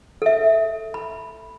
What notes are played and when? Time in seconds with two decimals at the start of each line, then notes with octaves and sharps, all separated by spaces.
0.22 A4 E5
0.94 B5